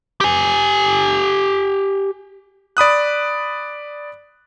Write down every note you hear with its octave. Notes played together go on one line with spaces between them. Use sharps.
G4 G#5
D5 B5 D#6 F#6